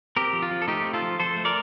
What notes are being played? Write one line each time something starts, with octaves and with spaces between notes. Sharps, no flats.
C4 G4 A#4
F3
F4
F3
A4
A3 D#4 G4
C4
F4 A4
F3
F3 A4 C5
A3
A#4 D5